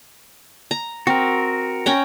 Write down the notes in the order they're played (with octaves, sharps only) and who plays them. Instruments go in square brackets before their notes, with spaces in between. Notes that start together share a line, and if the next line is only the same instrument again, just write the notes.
[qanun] A#5
[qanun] C4 [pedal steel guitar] F#4 A#4
[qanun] C#4 G5 A#5